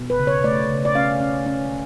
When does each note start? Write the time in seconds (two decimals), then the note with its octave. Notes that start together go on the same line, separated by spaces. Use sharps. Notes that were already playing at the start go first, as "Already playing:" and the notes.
Already playing: B2
0.10 B4
0.19 C#3
0.27 C#5
0.44 A3 D5
0.70 C#3
0.85 D5
0.95 C#4 F5
1.20 C#4
1.46 C#4